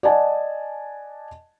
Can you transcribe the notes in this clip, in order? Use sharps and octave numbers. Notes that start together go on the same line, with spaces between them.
D5 D#5 F#5 G#5 A5